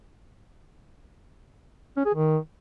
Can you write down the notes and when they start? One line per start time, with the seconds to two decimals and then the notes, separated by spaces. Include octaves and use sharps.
1.96 C#4
2.05 G#4
2.14 D#3